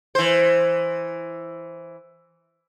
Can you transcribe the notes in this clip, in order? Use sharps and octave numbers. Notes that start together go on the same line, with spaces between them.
E3 C5